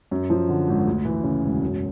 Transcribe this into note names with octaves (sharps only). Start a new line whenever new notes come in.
F#2
F3
D3
G#1
D2
E3
C#3
E1
F#2